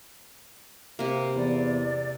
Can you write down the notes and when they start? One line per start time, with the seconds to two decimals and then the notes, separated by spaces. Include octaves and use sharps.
0.99 C3 A#3
1.36 E2 D5